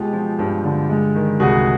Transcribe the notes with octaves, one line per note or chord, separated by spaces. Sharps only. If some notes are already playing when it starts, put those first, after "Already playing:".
Already playing: B2 G#3 F4 G4
F3
G2
D3
G#3
D#3
C2 F#4 G#4